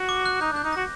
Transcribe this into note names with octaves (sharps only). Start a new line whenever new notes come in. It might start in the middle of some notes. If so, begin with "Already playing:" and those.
Already playing: F#4
D6
F#6
D#4 G6
D4 G6
D#4
F#4 A#6